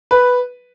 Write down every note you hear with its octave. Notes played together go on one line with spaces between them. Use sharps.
B4